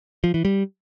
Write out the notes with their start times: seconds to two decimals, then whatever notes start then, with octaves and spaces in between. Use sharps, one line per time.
0.24 F3
0.34 E3
0.45 G3